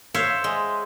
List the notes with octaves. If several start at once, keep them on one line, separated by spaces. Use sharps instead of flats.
C5 C#5 E5 F5
G#3